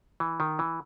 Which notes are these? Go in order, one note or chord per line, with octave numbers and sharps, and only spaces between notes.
E3
D#3
E3